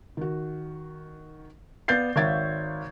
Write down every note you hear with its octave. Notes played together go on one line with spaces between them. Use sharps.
D#3 F#4
B3 D5 F5 G6 A6 C7
G#1 C#5 E5 F5 G#6 A6